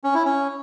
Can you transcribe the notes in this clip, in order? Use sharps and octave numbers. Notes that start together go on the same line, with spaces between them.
C#4
E4
C#4